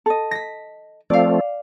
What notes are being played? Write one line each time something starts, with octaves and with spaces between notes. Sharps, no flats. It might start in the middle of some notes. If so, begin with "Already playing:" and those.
A4 D#5
A#6 B6
F3 A3 C4 D5 F5